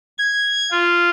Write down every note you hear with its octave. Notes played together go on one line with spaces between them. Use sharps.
G#6
F4